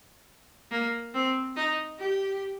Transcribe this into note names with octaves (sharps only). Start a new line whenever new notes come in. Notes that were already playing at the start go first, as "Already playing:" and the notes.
A#3
C4
D#4
G4